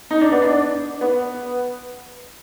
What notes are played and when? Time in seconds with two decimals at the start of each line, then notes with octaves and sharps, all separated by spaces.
0.11 D#4
0.21 D4
0.32 B3
0.42 D4
1.01 B3